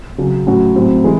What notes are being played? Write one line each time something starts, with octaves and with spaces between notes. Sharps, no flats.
C#3 F#3 C#4
A2 F#3 C#4 F#4
A2 F#3 C4
E3 G#3